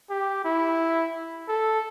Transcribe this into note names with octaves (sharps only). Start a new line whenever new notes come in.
G4
E4
A4